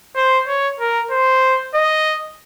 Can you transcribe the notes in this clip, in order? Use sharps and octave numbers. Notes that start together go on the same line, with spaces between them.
C5
C#5
A#4
C5
D#5